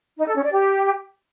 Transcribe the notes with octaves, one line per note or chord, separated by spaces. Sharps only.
D#4
A4
C#4
D5
G4